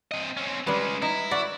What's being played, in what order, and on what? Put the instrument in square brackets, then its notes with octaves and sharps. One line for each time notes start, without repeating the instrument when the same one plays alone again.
[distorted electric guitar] C4 D#5
C4 C#4
[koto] G3 B4 [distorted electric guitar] G#3 C#4
[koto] D#4 [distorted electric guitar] E4
[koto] F#4 D5